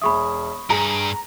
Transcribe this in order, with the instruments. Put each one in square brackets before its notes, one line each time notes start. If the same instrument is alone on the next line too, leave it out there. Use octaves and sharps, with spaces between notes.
[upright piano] E1 G#4 E5 [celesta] B5 C#6 D#6
[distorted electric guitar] G2 [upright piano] G#4 [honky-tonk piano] A#5